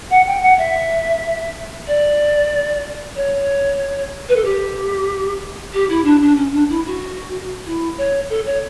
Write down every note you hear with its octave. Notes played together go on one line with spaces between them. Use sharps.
F#5
G5
F#5
E5
D5
C#5
B4
A4
G4
G4
E4
D4
D4
C#4
D4
E4
F#4
E4
C#5
A4
C#5